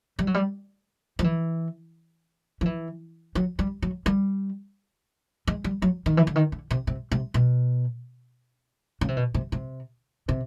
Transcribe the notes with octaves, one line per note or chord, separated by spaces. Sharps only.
G3
F#3
G3
F3
E3
F3
E3
F#3
G3
F#3
G3
G#3
G3
F#3
D#3
E3
D3
D#3
D3
C3
C3
C3
B2
C#3
C3
B2
C3
C3
C3